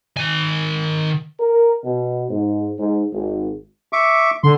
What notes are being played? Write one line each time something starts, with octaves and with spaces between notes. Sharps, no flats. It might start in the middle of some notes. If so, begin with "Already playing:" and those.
D#3 G#5
A#4
B2
G#2
G#2
G#1
E5 C#6 D6
D3 C6